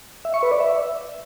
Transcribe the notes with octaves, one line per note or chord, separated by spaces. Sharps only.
E5
C#6
B4
D5
E5